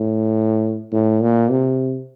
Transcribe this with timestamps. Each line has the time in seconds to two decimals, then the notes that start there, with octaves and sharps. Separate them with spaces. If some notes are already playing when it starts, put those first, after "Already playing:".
Already playing: A2
0.92 A2
1.21 A#2
1.50 C3